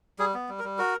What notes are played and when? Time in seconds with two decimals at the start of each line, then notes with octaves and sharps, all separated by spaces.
0.19 G3 G#4
0.34 B3
0.49 G3
0.59 A#4
0.64 G3
0.79 F#4 A#4